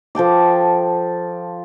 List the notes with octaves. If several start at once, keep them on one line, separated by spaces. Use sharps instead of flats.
F3 A4 G5 D6